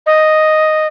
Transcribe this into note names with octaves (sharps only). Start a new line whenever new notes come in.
D#5